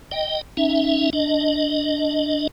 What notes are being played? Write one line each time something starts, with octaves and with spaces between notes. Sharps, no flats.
D#5 G5
C#4 D#4 E5
D4 D#5